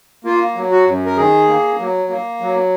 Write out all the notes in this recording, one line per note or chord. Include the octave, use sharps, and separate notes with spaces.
A#3 F4
F#3
F#4
F#2
A#4
D#3 G#4
A#3
F#3
A#3
F#3